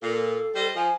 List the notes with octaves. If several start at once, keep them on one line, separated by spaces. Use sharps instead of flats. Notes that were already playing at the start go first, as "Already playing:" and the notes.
A#2 A4
G3 C5 D#5
F3 G#5